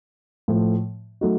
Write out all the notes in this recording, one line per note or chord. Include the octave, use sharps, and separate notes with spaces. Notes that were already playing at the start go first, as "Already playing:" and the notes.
A2 F3 A3
F#3 A3 D#4 F#4